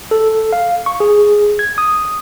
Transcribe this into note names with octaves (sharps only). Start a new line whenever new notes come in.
A4
F5
C#6
G#4
G#6
D#6